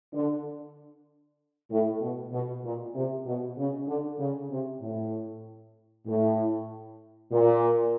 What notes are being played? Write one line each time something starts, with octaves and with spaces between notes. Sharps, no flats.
D3
A2
B2
B2
A#2
C3
B2
C#3
D3
C#3
C3
A2
A2
A#2